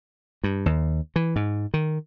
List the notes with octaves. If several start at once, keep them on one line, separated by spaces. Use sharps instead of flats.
G2
D#2
E3
G#2
D#3